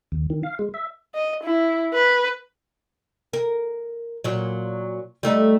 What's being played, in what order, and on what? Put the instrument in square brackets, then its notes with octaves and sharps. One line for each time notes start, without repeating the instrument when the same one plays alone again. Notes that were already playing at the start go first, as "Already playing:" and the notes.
[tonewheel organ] D#2
D#3
F5
G#3
E5
[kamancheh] D#5
E4
B4
[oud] A#4
A#2 F#3
G3 A3 D#4